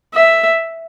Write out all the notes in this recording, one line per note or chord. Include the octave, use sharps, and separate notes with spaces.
E5